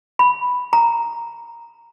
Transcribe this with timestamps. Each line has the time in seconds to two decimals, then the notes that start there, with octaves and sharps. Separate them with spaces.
0.19 B5
0.73 A#5